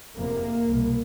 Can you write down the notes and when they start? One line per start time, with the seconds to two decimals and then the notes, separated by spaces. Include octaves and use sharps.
0.16 F1 E2 C3 A#3
0.67 C2 B2